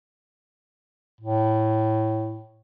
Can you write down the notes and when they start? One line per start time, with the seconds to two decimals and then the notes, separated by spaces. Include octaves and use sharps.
1.21 A2